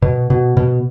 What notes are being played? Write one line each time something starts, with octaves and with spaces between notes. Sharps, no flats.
B2
B2
B2